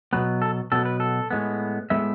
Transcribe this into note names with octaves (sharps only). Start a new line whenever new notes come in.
B2 F#3 B3 B4
A4
B2 F#3 B3 A4
B4
A4
A2 G#3 B3
A2 G#3 B3 E5